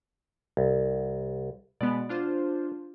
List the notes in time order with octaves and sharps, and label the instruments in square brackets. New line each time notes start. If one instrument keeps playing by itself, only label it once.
[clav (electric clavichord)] C2
[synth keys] B2 G#3 B3 [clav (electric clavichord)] D5
[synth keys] D4 F4 C5